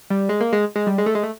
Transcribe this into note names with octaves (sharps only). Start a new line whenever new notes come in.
G3
G#3
A#3
G#3
G#3
G3
G#3
A3
G#3
A3